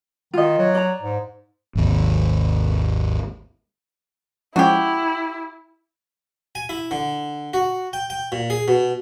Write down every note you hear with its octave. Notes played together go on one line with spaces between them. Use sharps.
D#3 F4 D#5
F#3
D5 A#5
G#2
G#1 D#2
F3 G#3 C#4 E4 F#4 G4
G#5
E4
D3
F#4
G5
G5
A#2
G#4
B2